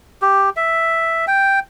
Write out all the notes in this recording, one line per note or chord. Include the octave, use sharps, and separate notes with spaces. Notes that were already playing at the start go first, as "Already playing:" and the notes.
G4
E5
G5